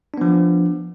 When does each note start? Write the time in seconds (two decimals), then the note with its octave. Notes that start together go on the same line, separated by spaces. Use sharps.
0.14 D4
0.18 B3
0.21 F3